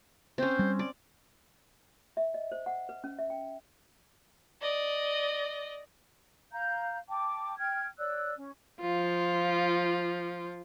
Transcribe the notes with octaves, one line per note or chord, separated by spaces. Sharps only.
C4 C#4 C5
G3
D5
E5
D#5
C5
F#5
B4
C#4
E5
G5
D5 D#5
F5 A#5 G6
G5 A5 D6
G5 F6 G#6
C#5 D5 E6 F#6
C#4
F3 F4